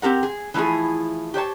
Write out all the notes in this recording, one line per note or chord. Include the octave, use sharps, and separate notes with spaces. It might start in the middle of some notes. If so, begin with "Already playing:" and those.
C4 G4 A#4 F#5
G#4
E3 F3 A3 E4 G#4
G4 C5 C#5 A5